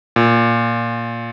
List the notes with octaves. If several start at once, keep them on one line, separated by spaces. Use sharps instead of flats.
A#2